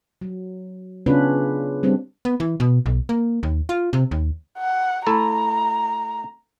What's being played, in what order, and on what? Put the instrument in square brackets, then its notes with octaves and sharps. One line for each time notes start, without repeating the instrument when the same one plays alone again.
[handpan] F#3
C#3 B3 C#4 D4 F4 B4
G3 C4 D4
[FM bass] B3
E3
B2
B1
A#3
D#2
F4
C3
D#2
[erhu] F#5
[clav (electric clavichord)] A3 E4 A4 [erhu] A#5